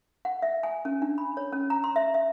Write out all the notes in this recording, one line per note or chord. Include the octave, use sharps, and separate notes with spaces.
F#5
E5
G#5
C#4
D4
B5
C#5
C#4
A#5
C6
E5
E5